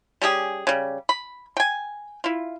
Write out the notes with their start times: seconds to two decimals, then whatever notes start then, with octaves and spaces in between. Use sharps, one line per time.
0.22 G3 C#4 G4 G#4
0.67 C#3 G3
1.09 B5
1.57 G5 G#5
2.24 E4 F4